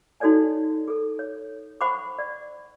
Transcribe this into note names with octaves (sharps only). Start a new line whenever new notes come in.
D#4 F#4 A4 C#5 D5 G#5
G#4 A4
C#5
C5 F#5 B5 C#6 D6
D5